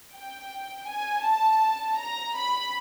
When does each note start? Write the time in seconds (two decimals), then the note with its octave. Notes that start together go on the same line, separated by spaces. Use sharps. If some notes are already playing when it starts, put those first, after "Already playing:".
0.14 G5
0.87 G#5
1.24 A5
1.98 A#5
2.35 B5